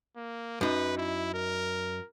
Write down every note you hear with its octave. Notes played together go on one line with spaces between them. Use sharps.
A#3
F#2 D#4 B4
E4
A#4